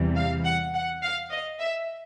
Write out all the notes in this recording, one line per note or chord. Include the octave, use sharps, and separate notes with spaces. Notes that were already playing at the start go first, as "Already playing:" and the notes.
Already playing: E2 C3 E3 G3
F5
F#5
F#5
F5
D#5
E5